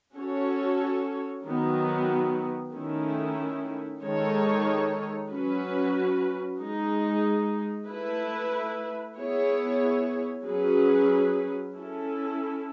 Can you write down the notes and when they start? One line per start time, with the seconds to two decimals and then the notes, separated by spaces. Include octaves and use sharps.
0.15 C#4 F#4 A4 C#5
1.44 D#3 F#3 B3
2.72 D#3 A3 C#4 E4
4.02 D#3 G#3 D#4 A4 C#5
5.30 F#3 C#4 F#4 B4
6.59 G#3 D#4 G#4
7.88 A3 E4 B4
9.17 B3 E4 G#4 C#5
10.45 F#3 C#4 G#4 B4
11.74 C#4 E4 A4